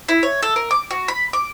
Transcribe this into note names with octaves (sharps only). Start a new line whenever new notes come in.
E4
C#5
A4
A#4
D6
F#4
B5
D6